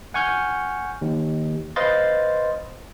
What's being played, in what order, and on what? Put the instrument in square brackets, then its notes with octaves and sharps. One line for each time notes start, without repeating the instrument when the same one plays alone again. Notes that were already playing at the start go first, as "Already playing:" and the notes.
[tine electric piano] F#5 G#5 C#6 F6 G6
D#2
B4 C5 D#5 F5 C6 A6